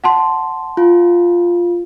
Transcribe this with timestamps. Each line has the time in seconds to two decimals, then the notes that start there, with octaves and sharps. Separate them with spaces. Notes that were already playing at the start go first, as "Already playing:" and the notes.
0.04 F#5 A5 C6
0.77 F4